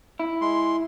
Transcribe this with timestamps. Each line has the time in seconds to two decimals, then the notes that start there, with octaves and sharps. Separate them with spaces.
0.20 E4
0.41 G#3 C6